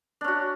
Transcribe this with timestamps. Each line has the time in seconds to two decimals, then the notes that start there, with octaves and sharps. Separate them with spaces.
0.21 D4
0.24 C#4
0.28 F#4